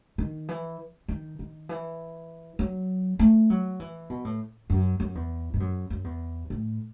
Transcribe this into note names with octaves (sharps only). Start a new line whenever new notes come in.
D#3
E3
D#3
D#3
E3
F#3
A3
F#3
E3
B2
A2
F#2
F#2
E2
G#2
F#2
F#2
E2
A2